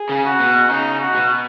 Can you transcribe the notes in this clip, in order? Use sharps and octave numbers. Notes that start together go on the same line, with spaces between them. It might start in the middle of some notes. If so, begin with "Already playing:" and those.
Already playing: G#4
C#3
F#4
B2
C#3 D#4
F#4
B2